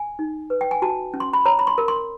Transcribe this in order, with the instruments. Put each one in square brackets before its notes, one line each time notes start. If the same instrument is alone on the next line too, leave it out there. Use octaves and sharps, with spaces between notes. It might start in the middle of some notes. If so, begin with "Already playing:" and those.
Already playing: [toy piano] G#5
D#4
B4
G5
G#5
F#4 A5
C#4
C6
B5
C#5 A#5
B5
C6
A#4
C6